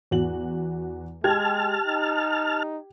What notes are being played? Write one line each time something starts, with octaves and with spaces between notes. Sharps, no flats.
E2 F#4 F#7
G#3 G4 A5 F6 G#6
D#4